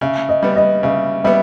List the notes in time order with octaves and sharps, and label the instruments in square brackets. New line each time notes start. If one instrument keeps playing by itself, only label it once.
[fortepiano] C#3 [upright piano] E5
[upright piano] D#5
[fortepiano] G3 B3
[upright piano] D#5
[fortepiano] C#3 [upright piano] E5
[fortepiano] G3 B3 [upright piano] E5